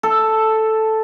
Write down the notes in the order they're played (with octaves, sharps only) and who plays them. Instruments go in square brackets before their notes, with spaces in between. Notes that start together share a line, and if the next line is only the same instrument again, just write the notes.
[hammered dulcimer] A4